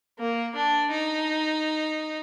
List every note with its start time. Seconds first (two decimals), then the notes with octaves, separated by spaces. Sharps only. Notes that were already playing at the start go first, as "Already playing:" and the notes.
0.19 A#3
0.55 D4
0.91 D#4